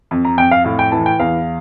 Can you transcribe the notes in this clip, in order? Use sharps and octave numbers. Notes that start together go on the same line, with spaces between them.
F2
A#5
F2 G5
F5
A2 F5
G5
E3 A5
G5
E2 F5